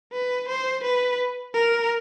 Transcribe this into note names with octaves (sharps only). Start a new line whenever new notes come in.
B4
C5
B4
A#4